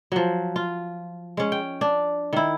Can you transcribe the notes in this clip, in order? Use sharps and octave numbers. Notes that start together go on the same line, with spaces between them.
F3 F#3
F4
G#3 C#4
G5
D4
D#3 E4